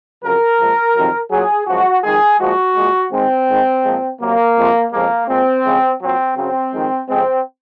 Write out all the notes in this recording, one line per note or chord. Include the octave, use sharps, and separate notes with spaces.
F2 C#3 F#3 A#4
A#2 F3 G#3
F2 C3 D#3 F#3
A#2 F#3 G#4
F#2 F3 G#3 F#4
F2 D#3 G#3 G#4
A#2 F3 G#3 F#4
A#2 G#3
G#2 D#3 G#3 C4
G#2 D#3 G#3
A#2 F3 G#3
C3 F#3 A#3
F2 C3 F3 G#3
F2 C#3 F3 G#3 A#3
A#2 G#3 C4
F2 C#3 G#3
A#2 F#3 C4
F#2 C#3 F#3 C4
F2 D#3 G#3
F2 C#3 G#3 C4